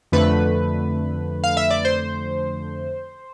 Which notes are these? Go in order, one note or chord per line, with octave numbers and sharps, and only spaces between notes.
F2 D3 A3 B4
F5
E5
D5
C5